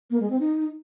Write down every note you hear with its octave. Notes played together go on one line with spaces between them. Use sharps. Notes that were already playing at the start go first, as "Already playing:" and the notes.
A#3
G#3
C4
D#4